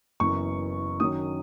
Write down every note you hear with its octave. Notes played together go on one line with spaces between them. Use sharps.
F#1 F#2 E3 B3 C#6
F#2 D#3 F#3 C#4 D#6